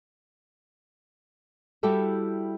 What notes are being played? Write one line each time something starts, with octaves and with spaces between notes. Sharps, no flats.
G3 E4 F#4 G4 A4 E5